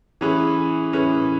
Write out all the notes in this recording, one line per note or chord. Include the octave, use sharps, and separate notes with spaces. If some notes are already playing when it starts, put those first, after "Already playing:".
E3 C#4 G#4 B4
E3 C#4 G#4 B4